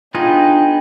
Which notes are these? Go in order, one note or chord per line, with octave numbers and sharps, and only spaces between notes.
B3 D4 D#4 F4 G#4 G5